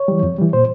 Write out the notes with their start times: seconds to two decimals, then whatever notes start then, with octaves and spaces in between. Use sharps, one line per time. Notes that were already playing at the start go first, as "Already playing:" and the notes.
Already playing: C#5
0.08 E3 G3
0.23 F2
0.38 E3 G3
0.53 A#2 C5